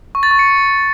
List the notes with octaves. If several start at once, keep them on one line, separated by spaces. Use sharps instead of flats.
C#6
A6
C#6
C#7